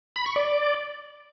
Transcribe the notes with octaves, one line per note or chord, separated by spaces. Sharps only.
B5
C#6
D5